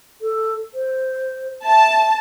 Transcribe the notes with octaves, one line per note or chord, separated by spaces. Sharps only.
A4
C5
E5 A5